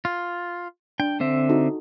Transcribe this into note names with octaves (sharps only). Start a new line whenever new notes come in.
F4
D4 G5
D3 C4 E5
D#4 F#4 A4